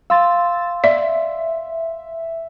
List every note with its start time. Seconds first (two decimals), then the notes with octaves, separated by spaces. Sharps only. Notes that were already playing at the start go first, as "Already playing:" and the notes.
0.10 F5 C6 E6 A6
0.84 D5 E5